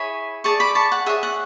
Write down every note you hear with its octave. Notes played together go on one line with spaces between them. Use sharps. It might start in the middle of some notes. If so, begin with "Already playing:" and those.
Already playing: E4 G#4 C#5 G#5 B5
G#4 D5 A5 C#6
B5 D6
A5 C#6
F#5
G#4 C#5 E5
F#5